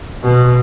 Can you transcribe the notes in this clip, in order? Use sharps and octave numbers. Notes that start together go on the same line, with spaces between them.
B2